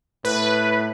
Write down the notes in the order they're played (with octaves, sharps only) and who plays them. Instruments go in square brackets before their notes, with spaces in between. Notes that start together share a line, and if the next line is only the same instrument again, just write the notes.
[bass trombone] A2 [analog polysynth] B4